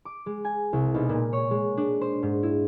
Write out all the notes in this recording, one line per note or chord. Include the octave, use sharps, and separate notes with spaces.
D6
G#3
G#5
C2
B1
A#2
C#5
G#3
D4
C5
G#2
E4